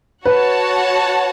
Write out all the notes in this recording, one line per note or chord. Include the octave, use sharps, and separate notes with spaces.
F#4 B4 C#5 F#5 A5